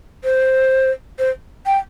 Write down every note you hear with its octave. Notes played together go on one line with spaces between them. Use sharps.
C5
C5
G5